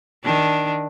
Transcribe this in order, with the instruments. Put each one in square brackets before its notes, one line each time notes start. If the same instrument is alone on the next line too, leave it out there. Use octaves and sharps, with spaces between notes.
[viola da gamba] D#3 D4